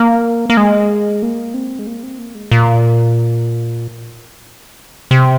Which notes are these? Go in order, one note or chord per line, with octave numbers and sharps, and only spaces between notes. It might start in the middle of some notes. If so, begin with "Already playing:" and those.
Already playing: A#3
A#3
G#3
A#3
C4
G#3
A#3
C4
A#3
G#3
A#2
C3